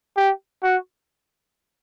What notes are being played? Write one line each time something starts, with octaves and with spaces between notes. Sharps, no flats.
G4
F#4